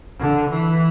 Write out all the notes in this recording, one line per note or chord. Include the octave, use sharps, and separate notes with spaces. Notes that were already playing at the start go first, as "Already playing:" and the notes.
D3
E3